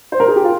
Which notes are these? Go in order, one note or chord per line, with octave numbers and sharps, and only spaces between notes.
C5
A#4
G#4
G4
F4